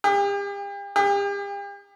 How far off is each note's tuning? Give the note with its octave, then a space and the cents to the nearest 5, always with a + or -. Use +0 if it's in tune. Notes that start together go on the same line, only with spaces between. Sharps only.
G4 +40
G4 +40